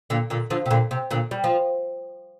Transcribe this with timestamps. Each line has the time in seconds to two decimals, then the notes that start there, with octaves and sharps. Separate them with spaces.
0.10 A#2 D3
0.30 A#2 D3
0.50 D3 F3
0.66 C3
0.71 A#2 D3
0.91 C3
1.11 A#2 D3
1.31 G3
1.44 F3